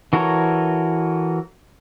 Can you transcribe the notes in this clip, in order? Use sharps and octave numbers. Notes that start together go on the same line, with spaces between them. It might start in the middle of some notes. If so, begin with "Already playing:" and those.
E3 F#4 A4 A#4 C#5